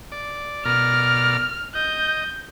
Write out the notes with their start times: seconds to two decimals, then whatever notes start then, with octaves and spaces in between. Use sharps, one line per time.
0.12 D5
0.65 B2 A#4 D5 F6
1.75 D#5 G6